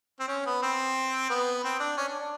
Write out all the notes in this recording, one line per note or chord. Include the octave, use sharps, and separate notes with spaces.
C4
C#4
B3
C4
B3
C4
D4
C#4
D4
D4